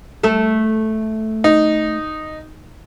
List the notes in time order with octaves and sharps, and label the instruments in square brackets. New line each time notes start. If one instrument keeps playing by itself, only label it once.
[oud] A3 A4
[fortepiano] D#4